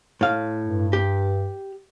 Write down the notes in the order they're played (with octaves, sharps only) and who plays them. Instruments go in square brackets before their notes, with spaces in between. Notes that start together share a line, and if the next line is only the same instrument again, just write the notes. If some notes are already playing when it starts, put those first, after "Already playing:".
[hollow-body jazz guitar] A2 F5
[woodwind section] G2
[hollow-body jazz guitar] G4